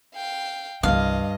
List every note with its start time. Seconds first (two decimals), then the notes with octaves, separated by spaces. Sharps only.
0.15 F5 G5
0.83 C2 G2 E3 D#5 F5